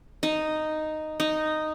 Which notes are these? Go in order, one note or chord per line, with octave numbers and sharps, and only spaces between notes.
D#4
D#4